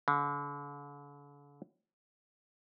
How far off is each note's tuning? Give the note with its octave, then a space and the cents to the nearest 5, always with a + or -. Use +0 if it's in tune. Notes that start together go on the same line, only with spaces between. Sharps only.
D3 -40